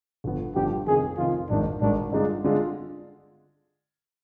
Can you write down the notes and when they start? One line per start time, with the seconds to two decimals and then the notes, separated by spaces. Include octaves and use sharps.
0.24 G1 G2 F3 B3
0.55 G1 G2 F3 B3 G4
0.87 F1 F2 D#3 G#4
1.18 F1 F2 D#3 F4
1.50 G#1 G#2 D#3 D4
1.81 G#1 G#2 D#3 D4
2.12 G2 D3 G#3 D4 D#4 F4
2.44 D3 G#3 D4 F4